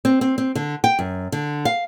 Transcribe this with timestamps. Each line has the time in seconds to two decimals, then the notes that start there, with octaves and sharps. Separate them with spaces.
0.05 C4
0.21 C4
0.38 C4
0.55 D3
0.84 G5
0.99 F#2
1.32 D3
1.65 F5